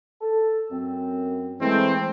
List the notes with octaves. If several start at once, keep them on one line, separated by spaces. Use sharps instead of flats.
A4
F#2 C4
E3 G#3 A3 C4